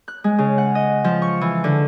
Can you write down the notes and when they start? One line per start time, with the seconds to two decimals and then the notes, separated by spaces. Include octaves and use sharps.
0.08 F#6
0.24 G#3
0.38 C#3
0.58 F#5
0.75 D#5
1.04 F3
1.22 C#6
1.41 E3
1.64 D3